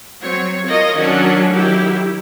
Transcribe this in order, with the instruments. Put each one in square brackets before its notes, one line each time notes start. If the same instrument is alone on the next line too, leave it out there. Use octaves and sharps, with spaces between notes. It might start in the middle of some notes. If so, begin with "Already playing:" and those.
[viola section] F#3 C4 C#5
F4 A#4 C#5 D#5
D#3 F#3 C#4 D4 C#5
D#3 F#3 E4 G4